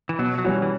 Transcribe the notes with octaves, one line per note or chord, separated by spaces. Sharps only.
E3
B2 F#3
F#3
E3 G3 C#4 F#4
E3